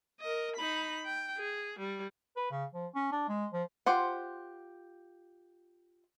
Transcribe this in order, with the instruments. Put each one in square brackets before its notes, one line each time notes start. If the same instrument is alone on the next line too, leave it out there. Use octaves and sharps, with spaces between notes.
[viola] A#4 D#5
D#4 B5
G5
G#4
G3
[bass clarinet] B4
C#3
F3
C#4
D4
G#3
F3
[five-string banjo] F4 G4 C5 F#5